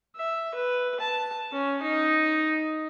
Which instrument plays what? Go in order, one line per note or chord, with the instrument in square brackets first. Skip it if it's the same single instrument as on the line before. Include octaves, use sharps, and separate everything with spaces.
[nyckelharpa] E5
B4
A5
C#4
D#4